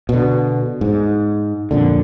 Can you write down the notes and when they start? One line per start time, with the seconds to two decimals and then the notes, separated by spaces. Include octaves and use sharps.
0.09 B2 D3
0.81 G#2
1.71 F2 A#2 D3